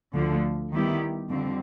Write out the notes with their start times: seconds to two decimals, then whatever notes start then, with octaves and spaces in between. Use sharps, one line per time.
0.14 D2 D3 F3
0.72 D#3 G3 B3 E4 G4
1.30 F2 D3 G3 C4